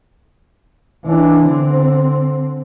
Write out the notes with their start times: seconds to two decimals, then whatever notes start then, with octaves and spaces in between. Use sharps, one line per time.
1.05 E3 D4
1.46 D3 C4